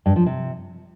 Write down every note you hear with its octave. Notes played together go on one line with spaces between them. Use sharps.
G2
F3
C3